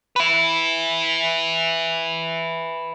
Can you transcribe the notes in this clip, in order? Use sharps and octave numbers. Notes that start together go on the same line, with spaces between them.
B4 E5